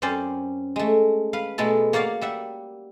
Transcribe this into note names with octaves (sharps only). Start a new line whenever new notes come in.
F#2 C4 C#4 C5 D5
G#3 A3
B4 F5
B2 G#3 A3 B3 A4
A#3 C#5 D5 F5 F#5
G3 E5 F#5